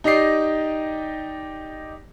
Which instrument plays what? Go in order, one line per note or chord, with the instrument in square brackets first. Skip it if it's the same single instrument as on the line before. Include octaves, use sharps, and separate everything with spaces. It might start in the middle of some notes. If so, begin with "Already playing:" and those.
[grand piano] D#4 G4 D5 D#5 C7